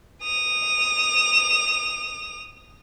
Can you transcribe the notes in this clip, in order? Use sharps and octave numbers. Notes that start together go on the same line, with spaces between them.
D#6 F7